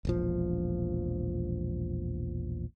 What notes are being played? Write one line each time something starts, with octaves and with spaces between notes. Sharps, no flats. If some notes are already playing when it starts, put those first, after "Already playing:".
E1 A#1 F3